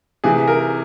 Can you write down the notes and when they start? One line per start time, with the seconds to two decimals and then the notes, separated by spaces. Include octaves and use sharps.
0.24 C3 E3 G#4
0.48 A#4